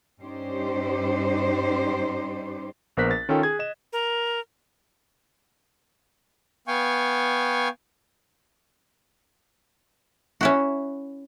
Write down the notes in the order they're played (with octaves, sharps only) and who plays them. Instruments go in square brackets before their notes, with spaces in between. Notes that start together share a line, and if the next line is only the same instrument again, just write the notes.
[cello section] G2 C#4 D#4 G4 C5 D5
[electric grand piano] A#1 B3 A#4 C5 F#6 B6
A6
D#3 C#4 F4 A4 G5
G#4 G#6
D#5 E7
[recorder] A#4
[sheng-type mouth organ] B3 F5 G5 G#5 C#6
[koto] C#4 E4 F#4